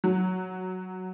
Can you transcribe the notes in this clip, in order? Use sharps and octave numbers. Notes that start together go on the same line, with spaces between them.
F#3